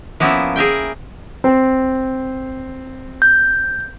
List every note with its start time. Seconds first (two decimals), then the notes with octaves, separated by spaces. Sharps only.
0.20 F3 A#3 B3 C#4 E4
0.56 G#4 A#4 E5 G5
1.44 C4
3.22 G6